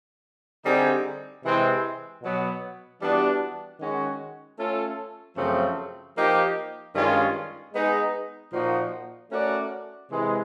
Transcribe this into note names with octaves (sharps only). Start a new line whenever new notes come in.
D3 G3 C4 D#4 G#4
C3 E3 G#3 C4
B2 F#3 B3
E3 G3 B3 D4 F#4
D#3 G#3 C#4 F#4
A3 C#4 F4 A4
F#2 C#3 F3 A3 C4
F3 A#3 D#4 G4
G2 D#3 G#3 C#4 F4
G#3 B3 D#4 G#4
A#2 F3 A#3 D#4 F#4
A3 C#4 F#4 A#4 D5
C3 E3 G#3